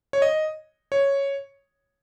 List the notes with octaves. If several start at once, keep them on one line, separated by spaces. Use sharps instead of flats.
C#5
D#5
C#5